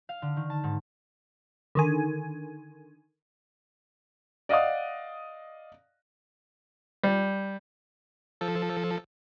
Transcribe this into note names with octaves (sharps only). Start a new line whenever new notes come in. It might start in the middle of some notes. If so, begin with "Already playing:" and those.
F5
D3
D#3
A5
G#2
D3 D#3 G#5
D5 D#5 F5 F#5 D#6
G3
F3 A4